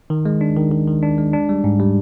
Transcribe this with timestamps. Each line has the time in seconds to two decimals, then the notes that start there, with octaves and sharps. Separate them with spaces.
0.10 D#3
0.25 G#3
0.41 D4
0.57 D#3
0.72 D#3
0.87 D#3
1.03 D4
1.18 G#3
1.33 D4
1.49 G3
1.64 G#2
1.80 G3